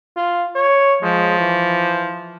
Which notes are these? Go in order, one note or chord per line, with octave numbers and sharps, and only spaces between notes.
F4
C#5
F3 G#3
E3